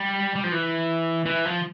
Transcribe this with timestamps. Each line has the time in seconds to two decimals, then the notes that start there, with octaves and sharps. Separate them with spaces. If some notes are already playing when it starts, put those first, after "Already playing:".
Already playing: G3
0.35 G3
0.44 F3
0.52 E3
1.26 E3
1.45 F3